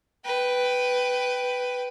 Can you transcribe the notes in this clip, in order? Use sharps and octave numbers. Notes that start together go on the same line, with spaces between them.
B4 G5